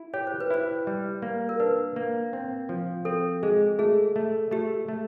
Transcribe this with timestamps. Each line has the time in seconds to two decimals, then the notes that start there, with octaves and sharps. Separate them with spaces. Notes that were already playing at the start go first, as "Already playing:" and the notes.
Already playing: E4
0.14 G4 C#5
0.27 C5
0.40 B4
0.50 E4 C5
0.87 G3
1.22 A#3
1.49 A#4
1.60 D4 B4
1.96 A#3
2.33 C4
2.69 F3
3.05 C4 A4
3.43 G#3 G#4
3.79 A3 G#4
4.16 A3
4.51 A3 G4
4.88 A3